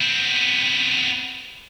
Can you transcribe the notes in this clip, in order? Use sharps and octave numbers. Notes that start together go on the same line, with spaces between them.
B3 C4